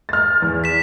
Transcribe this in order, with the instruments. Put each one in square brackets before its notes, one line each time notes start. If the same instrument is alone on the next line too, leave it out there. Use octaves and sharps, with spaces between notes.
[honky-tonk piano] F6 A6
E2
[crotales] B6 E7